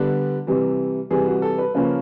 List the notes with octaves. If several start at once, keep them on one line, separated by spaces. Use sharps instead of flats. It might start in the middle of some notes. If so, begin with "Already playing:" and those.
Already playing: D3 G3 B3 D4
C3 E3 G3
C3 E3 G3 G#4
F#4
A4
B4
C#3 F3 A#3 C#4 B4